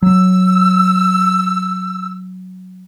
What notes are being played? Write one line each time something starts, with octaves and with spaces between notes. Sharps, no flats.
F#3 E6